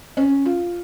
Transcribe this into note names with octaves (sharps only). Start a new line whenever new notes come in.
C#4
F4